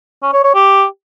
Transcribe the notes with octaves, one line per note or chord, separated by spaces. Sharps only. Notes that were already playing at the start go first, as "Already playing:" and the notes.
C#4
C#5
C#5
G4